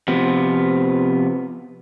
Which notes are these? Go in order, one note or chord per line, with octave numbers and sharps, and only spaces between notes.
C3 F3 B3